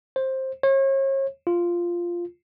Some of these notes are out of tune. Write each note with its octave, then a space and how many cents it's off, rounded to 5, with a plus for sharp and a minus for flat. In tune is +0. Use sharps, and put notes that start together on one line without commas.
C5 +15
C#5 -40
F4 -5